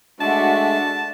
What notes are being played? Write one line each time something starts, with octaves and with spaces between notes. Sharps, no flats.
G#3 A3 D4 F#4 D5 E5 A5